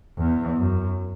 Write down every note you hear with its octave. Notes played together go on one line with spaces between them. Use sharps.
E2
F#2